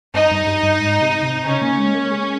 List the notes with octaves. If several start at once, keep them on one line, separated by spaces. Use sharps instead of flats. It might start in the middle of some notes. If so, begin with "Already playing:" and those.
G2 D#4
G2
G2
G2
G#2
C3
C3
C#3 C#4
A#3
G#3
A#3
G#3